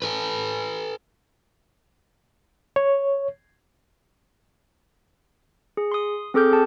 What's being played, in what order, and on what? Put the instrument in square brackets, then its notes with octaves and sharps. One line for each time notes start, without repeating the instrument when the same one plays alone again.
[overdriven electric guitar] A4 B4
[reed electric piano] C#5
[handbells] G#4
C6 D#6
C4 G#4 A4 D6 F6 G6
G#4 A5